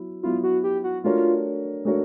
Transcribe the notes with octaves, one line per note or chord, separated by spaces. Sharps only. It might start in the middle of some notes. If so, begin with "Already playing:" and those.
Already playing: F#3 B3 E4
F#3 B3 E4 F4
F#4
G4
F#4
A3 D4 F4 F#4 A#4 C#5
A3 D4 F#4 A#4 C#5